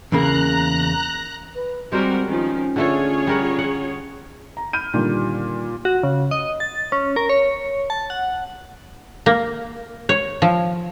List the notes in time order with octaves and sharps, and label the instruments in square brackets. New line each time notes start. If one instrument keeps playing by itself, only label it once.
[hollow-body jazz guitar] E2 C#3 A#3 [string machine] A#5 F#6
[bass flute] B4
[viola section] G3 F#4 A#4 [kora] G#3 C5 [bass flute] C4
[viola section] D#3 F3 [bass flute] C#4
[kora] D3 A3 A4 [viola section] F4 G#4 C#5
[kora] G3 A#4 F#5
F#5
[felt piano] A#5
[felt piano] B5 F6 G6 [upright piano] D#7
[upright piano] A#2 [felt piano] D3 D#3 G3
[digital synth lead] F#4
C#3
D#5
A6
C#4
A#4
C#5
A5
F#5
[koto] A#3
C#5
F3